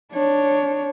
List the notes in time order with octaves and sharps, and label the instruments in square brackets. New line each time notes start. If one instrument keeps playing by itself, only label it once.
[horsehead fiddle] D4 C#5